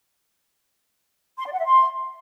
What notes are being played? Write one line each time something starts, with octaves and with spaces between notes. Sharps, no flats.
C6
D5
F#5
E5
C6